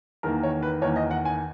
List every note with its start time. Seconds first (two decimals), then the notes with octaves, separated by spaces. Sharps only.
0.23 E2 D#3 A#3 A#4
0.43 C#5
0.62 B4
0.82 E2 D#3 A#3 C#5
0.96 D#5
1.11 F#5
1.25 G#5